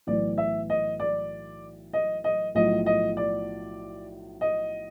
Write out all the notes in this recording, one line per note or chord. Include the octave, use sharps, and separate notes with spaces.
B1 A2 E3 D5
E5
D#5
D5
D#5
D#5
B1 A2 F3 D#5
D#5
D5
D#5